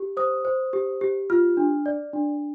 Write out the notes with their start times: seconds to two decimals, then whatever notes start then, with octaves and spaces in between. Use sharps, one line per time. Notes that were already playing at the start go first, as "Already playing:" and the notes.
Already playing: G4
0.17 C5 D#6
0.45 C5
0.73 G4
1.01 G4
1.30 F4 F6
1.57 D4
1.86 D5
2.13 D4